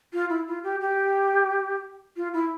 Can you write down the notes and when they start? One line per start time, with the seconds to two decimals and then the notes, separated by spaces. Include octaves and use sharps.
0.13 F4
0.29 E4
0.47 F4
0.63 G4
0.81 G4
2.16 F4
2.33 E4